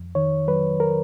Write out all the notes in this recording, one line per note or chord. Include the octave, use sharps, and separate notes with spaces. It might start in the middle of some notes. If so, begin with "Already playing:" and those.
Already playing: F2
D#3 C#5
F#3 B4
A#4